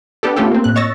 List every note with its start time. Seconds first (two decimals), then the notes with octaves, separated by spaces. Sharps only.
0.23 B3 D4 G4 A4
0.36 A3 B3 C#4 F4 G4 A4
0.51 A#3 C4
0.64 A2 F#6
0.76 C#5 D#5 C#6 E6 A6 A#6